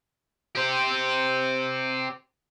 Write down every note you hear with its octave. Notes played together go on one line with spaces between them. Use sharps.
G4 C5